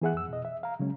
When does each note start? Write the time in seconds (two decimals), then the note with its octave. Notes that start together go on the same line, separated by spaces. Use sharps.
0.02 E3 B3 G#4 E5 F#5 F#6
0.14 F2 E6
0.29 B2 D#5
0.45 E5
0.63 F5 A#5
0.80 C#3 F#3 G#3 C#4